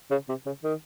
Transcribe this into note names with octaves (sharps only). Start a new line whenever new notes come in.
C#3
C3
C#3
D#3